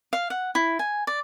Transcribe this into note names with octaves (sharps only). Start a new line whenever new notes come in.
F5
F#5
E4
G#5
D5